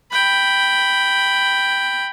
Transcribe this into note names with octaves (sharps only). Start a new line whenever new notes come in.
G5 B5